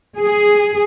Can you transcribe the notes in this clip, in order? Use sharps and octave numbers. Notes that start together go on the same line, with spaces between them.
G#4